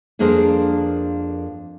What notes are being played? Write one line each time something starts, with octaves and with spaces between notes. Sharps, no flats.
F2 A#3 D4 G#4 A#4 C5